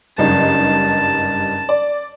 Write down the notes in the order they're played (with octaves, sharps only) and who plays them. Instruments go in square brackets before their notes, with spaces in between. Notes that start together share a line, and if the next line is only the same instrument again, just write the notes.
[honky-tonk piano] F#1 G2 D#4 [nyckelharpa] A5
[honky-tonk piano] D5